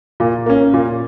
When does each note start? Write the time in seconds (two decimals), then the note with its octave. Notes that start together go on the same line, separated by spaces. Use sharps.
0.20 A#2
0.46 A#3 C#4
0.73 A#2